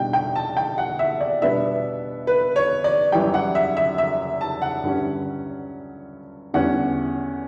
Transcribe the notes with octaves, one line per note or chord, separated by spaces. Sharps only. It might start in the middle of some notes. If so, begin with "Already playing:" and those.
Already playing: B2 G3 D4 G5
G5
A5
G5
F#5
E5
D5
B2 G3 B3 D4 E5
B4
C#5
D5
F#2 E3 G3 G5
F#5
E5
E5
E5
A5
F#5
G2 D3 G3 C#4
E2 D3 G3 C#4 F#5